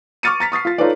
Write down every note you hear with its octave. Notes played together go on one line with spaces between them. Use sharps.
C#6 D6 F6 A6 C#7 D#7
A#5 A6 B6
C#6 D#6 A6 C7
F4 A6
D#4 F4 A4 B4 C#5 D5